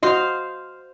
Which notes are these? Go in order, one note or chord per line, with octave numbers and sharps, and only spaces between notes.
F#4 C5 D#5 F5 C6